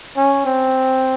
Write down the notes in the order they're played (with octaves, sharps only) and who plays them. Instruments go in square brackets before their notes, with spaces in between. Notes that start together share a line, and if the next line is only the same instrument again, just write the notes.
[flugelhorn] C#4
C4